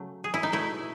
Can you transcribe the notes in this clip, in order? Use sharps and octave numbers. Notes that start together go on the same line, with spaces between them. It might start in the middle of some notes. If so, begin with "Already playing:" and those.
Already playing: C#3 F#3 A3
G#4
E4
D#4
B2 A3 E4